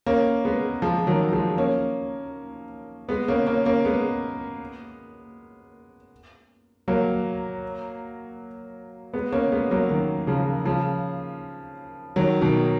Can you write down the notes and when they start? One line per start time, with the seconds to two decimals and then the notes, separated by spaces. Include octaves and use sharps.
0.06 A#3 C#4
0.45 G#3 B3
0.82 F3 G#3
1.07 D#3 F#3
1.32 F3 G#3
1.57 A#3 C#4
3.09 G#3 B3
3.28 A#3 C#4
3.46 A#3 C#4
3.65 A#3 C#4
3.85 G#3 B3
6.88 F#3 A#3
9.14 G#3 B3
9.32 A#3 C#4
9.52 G#3 B3
9.71 F#3 A#3
9.89 D#3 F#3
10.27 C#3 F3
10.65 C#3 F3
12.16 D#3 F#3
12.41 B2 D#3